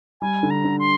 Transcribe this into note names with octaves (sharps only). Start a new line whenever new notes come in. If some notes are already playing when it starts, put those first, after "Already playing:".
G3 G#5
D3
A#5
D3
C6